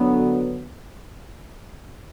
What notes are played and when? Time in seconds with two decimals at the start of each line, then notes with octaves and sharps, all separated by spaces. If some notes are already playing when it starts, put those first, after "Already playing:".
Already playing: D3 F#3 B3